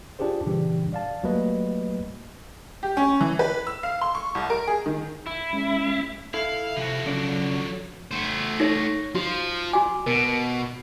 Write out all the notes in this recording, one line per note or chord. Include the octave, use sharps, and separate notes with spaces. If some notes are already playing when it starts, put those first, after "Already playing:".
D4 F4 G4 G#4 C5
A#2 C#3 E3 G3 D4 G4
D5 F5 A5
F#3 G3 A3 A#3 B4 D#5
G4
C#4
E3
B4
E6
F5
C6
C#6
C2
A#4
G#4
D#3
E4
G#3 C#4
E4 A4 F5
C3 F3 F#4
C#3 F#3 D4
A3 C5
D#4 A4 C#5 A#6
F3 F#4 C6
F#4 G#5 D6
B2 A#4